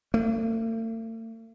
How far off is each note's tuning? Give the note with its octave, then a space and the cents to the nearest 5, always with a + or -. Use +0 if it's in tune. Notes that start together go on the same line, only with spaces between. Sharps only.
A3 +45